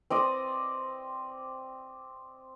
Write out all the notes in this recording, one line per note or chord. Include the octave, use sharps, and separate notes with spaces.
C4 D5 D#5